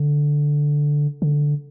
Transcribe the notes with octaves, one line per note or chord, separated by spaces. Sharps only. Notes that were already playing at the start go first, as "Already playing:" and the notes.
Already playing: D3
D3